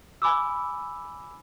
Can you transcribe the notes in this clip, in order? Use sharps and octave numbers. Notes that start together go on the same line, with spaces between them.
G#5 B5 D6 E6